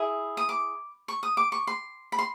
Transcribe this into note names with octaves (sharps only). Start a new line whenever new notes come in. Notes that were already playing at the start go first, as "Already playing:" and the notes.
Already playing: E4 G#4
D#6
D6
C#6
D#6
D6
C#6
C6
B5
C6